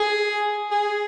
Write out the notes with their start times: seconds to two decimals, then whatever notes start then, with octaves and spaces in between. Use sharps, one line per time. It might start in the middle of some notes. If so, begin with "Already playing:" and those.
Already playing: G#4
0.71 G#4